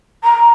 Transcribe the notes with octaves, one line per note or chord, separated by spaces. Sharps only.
A#5